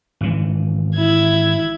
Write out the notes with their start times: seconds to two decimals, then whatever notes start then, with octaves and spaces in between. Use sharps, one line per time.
0.21 G#1 C#3 E3
0.96 E4 G#6